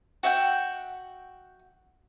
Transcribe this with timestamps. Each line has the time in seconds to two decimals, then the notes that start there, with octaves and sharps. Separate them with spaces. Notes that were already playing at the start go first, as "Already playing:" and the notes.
0.23 F#4 E5 F#5 G5